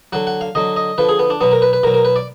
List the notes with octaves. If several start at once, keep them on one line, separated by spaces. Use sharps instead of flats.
D3 F#3 F#5
F#5
F5
D3 F#3 D#5
D#5
D3 F3 B4
G#4
B3
D4
B2 F#3 B3
A#4
B4
B4
B2 F#3 A#4
A#4
B4
D5